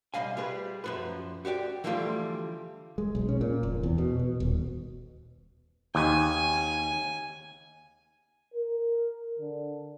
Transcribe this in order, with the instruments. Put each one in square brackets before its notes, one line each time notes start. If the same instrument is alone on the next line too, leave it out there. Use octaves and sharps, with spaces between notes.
[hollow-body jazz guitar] C3 G3 D#5 F5 G#5
G3 G#4 B4
F#2 F3 B4
F#4 G4 D5 G5
D3 E3 F3 G3 A3 F4
[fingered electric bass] G#3
B1
C#4
A#2
F1
E2
B2
B2
D#1
[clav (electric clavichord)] D#2 [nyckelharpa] G#5
[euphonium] A#4
D3